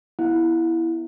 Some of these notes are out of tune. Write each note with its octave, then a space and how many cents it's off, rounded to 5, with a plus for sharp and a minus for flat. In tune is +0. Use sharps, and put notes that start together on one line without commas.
B3 +0 E4 +5 F#5 -45